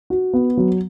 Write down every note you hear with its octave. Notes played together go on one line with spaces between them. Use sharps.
F#4
B3
F#3